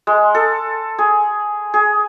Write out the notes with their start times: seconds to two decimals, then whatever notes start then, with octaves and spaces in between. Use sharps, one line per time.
0.07 G#3
0.35 A4
0.99 G#4
1.74 G#4